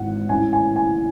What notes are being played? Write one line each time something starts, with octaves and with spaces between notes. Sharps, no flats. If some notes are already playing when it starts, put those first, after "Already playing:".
Already playing: G#1 G#2 E3 F#5
A1 A2 E3 G#5
G#5
G#5